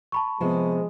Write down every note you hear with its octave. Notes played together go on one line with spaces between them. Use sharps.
A5 B5 C#6
C3 F3 G#3 B3